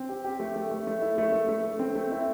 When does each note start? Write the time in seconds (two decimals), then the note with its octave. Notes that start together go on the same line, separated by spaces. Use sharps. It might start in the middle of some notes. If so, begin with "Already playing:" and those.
Already playing: C4
0.09 G4
0.24 G4
0.40 A3
0.56 A3
0.71 A3
0.87 A3
1.02 E4
1.18 A3
1.33 A3
1.49 A3
1.64 A3
1.79 C4
1.96 A3
2.12 E4